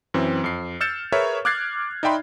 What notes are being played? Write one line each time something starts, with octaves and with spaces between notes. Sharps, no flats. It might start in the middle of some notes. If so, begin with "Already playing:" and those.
F#2 E3 C4
F2 C7
E6 F6 G6 A6 C#7 E7
G#4 A#4 B4 C#5 E5 C#6
D6 F6 F#6 G#6 A6 C7
D#4 D5 E5 G5 B5 C6